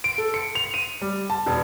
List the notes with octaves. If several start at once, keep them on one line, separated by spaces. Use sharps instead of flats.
D7
A4
C#7
F7
D#7
G3
A5
E1